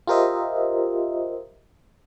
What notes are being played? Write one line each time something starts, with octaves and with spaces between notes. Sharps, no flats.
F4 G4 A#4 C5 D#5 E5